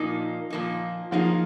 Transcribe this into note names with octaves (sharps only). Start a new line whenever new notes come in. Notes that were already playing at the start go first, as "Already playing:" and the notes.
Already playing: A#2 F3 A#3 D#4
A#2 F3 A#3 D#4
F3 A#3 D#4 F4 G#4